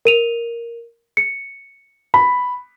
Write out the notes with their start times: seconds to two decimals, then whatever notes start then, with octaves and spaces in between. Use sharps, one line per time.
0.05 A#4 D#7 F7
1.17 C#7
2.14 B5